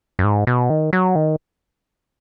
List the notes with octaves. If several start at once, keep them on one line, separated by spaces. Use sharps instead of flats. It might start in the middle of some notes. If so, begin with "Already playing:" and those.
F#2
G#2
B2
D#3
F#3
D#3